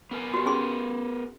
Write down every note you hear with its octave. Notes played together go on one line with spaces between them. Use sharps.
B3 A#4 G#5
F#4 G4
C#4 G#4 C6